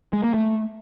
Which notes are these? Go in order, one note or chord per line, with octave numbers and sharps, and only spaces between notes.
G#3
A#3
A3